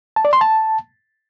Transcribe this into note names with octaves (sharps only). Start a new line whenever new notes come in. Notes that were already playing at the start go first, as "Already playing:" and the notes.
A5
D5
C6
A5